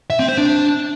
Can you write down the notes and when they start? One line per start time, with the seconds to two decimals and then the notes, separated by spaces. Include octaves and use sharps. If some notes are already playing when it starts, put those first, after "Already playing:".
0.10 E5
0.19 C4
0.28 C5
0.38 D4